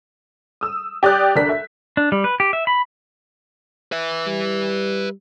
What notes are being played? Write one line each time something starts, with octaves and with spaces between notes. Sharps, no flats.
D#6 E6
G4 D5 D#6 F#6 G6
D2 D4 A#4 B6
E5
D4
G3
B4
G4
E5
B5
B4 E5
G3